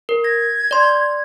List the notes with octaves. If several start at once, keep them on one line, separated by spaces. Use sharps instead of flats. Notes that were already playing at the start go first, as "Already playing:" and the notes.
A#4
G#6 A#6
D5 C6